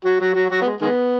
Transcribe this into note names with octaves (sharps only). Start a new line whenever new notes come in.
F#3 F#4
F#3 F#4
F#3 F#4
F#3 F#4
B3
G#3
D#3 G#3 B3